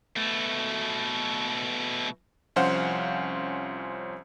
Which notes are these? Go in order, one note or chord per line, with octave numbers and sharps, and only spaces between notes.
B2 A3
C2 F3 C#4 C5 F5 F#5